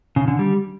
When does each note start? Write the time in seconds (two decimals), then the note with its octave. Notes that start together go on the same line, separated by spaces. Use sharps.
0.16 C#3
0.28 D3
0.39 G3